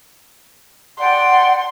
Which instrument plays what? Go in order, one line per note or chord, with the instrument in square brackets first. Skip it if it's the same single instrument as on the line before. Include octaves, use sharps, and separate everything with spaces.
[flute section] D5 F#5 G5 [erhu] C6